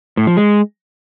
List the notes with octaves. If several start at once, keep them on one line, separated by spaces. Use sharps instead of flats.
A2
F3
G#3